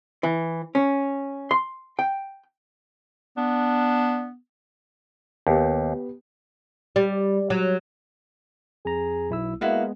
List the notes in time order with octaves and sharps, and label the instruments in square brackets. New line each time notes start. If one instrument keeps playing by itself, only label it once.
[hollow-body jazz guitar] E3
C#4
C6
G5
[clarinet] B3 [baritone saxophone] D4
[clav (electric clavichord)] D#2 [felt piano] B3 G4
[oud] G3
F#3
[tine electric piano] F2 A#5 [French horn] G#4
[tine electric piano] B1 E4 E6
[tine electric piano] G#3 B3 [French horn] A#3 [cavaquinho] E4 F#4 F5